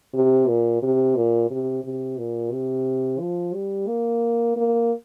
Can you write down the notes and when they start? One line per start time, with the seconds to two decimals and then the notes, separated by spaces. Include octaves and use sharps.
0.14 C3
0.48 A#2
0.82 C3
1.16 A#2
1.50 C3
1.84 C3
2.18 A#2
2.52 C3
3.20 F3
3.54 G3
3.88 A#3
4.56 A#3